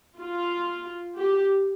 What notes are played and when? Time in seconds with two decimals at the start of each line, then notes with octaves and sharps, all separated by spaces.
0.19 F4
1.17 G4